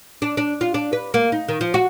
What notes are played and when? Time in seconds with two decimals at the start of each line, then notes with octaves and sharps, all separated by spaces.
0.22 D4
0.37 D4
0.61 F4
0.74 D4
0.93 B4
1.14 A#3
1.32 D#4
1.48 D#3
1.61 F3
1.74 F#4